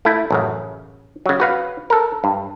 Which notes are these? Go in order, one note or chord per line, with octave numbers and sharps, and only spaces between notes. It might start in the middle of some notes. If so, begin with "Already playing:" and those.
A3 E4
A1 F#2 C#3
C#3 F#3
F#4 B4 F5
A4 A#4
G2